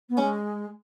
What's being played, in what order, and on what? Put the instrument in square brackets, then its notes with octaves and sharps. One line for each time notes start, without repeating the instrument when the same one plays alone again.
[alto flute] B3
[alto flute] G#3 [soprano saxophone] C#4